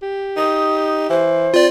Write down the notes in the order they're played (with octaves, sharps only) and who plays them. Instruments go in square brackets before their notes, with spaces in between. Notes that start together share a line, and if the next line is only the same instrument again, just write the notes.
[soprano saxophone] G4
[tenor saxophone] D#4 [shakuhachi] D#6
[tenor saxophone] E3 [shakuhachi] C5
[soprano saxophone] C4 [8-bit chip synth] F4 D5